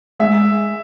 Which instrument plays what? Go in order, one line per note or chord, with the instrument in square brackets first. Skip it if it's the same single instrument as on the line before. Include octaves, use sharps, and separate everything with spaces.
[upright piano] G#3 [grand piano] E5